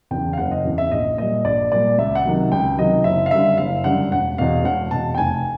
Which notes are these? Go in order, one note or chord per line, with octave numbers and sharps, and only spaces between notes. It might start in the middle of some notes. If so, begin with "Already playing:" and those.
E2 C#3 E3 G5
F5
F#1 F#5
D#5
E2 C#3 E3
E5
A#1 D#5
A#2 G3 D#5
A#1 D5
A#2 G3 D5
C#2 E5
F#5
C3 D#3 F#3
C#2 G5
C3 D#3 F#3 D#5
F#1 E5
F5
F#2 D3 G3 E5
F#1 F5
F#2 D3 G3 F#5
E1 F#5
E2 B2 F5
E1 F#5
E2 B2 A5
G5
F1 G#5